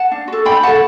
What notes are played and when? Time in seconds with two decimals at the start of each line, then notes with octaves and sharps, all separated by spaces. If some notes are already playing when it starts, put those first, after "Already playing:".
Already playing: F#5 A5
0.11 D4
0.28 F#4 A4
0.45 D4 G5 B5
0.63 F#4 A4 F#5 A5